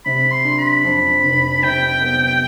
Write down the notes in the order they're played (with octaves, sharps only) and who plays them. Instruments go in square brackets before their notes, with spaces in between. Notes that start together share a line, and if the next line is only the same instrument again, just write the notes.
[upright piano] C3 [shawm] B5
[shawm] C6
[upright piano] D4
[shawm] B5
[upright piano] F2
F1
[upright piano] C3 [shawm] G5
[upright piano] B3